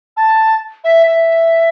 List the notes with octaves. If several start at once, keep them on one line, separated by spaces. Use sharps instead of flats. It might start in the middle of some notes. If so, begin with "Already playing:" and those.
A5
E5
E5